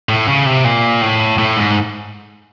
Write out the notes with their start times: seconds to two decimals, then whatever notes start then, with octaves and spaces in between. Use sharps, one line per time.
0.09 A2
0.28 C#3
0.46 C3
0.64 A#2
1.01 A2
1.38 A2
1.57 G#2